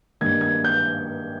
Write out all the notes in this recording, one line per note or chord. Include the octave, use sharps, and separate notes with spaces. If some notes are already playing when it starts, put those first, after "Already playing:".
G2 D#3 A#3 G#6
G#6
G6